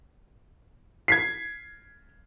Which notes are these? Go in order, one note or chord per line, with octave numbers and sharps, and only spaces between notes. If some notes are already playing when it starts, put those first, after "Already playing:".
G#6 B6 C7